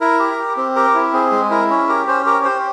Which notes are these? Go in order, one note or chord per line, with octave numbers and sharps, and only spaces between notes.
E4 A#4
G4
G4
C4
G4 A#4
E4
C4 G#4
G#3
E4 A#4
C#4
G4 A#4
C#4 C5
G4 A#4
G4 C5